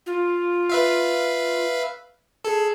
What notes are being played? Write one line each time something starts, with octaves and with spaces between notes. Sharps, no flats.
F4
B4 E5 F5
G#4 A4